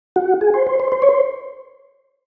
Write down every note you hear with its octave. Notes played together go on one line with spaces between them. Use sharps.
F#4
G#4
C5
C5
C5
C5
C#5
C5